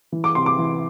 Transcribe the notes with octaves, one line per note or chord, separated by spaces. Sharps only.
E3
D6
C3 C6
D6
E3